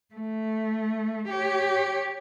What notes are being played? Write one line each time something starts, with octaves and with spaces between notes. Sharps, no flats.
A3
G4 C#5